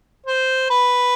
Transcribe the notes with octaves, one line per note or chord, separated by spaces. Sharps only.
C5
B4